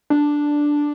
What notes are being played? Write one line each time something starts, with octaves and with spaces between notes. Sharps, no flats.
D4